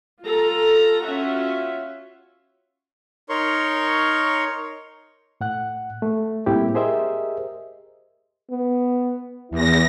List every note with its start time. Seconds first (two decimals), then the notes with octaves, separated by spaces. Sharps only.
0.23 F4 A4 A#5
1.04 C#4 F4 F#4 E5
3.29 D#4 A#4 C#5 C6 C#6
5.41 A2 F#5 F#6
6.02 A3
6.46 A2 G3 A#3 C4 E4 G4
6.75 G4 G#4 A#4 C5 D#5 E5
8.50 B3
9.51 E2 E4 A#6